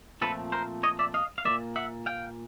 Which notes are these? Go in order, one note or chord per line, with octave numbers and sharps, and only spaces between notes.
A#2 F3 A3 C4 A4 B4
A#4 C5
C#5 D#5
D5 E5
D#5 F5
F5
A#2 F#3 A#3 D5 E5
E5 F#5
F5 G5